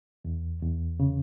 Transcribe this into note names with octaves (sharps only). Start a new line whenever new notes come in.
E2
E2
C#3